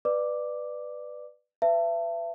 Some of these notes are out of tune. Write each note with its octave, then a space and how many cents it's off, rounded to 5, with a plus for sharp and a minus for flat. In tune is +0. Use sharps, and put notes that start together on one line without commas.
B4 +0 D5 +20 D6 +0
B4 +30 E5 +30 A5 +30